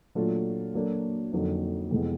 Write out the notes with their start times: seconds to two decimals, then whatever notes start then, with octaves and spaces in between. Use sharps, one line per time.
0.15 A#2 F#3 A3 D4 F4
0.74 F#3 A#3 D4 F#4 A4
1.33 F2 D3 F#3 A#3 D#4
1.91 F2 C3 E3 G#3 B3